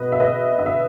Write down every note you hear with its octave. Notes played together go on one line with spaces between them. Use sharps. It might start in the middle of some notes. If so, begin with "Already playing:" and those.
Already playing: B2 G#3 B4 D#5
E5
B4 D#5
D#5
E5